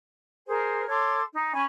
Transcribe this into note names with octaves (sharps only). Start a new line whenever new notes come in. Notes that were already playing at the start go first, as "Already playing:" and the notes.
G#4 A#4 C5
A4 C#5 C6 D6
D#4
C#4 G#5 B5 C#6